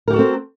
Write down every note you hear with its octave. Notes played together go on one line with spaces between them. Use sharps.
C4 F#4 G4 A4 A#4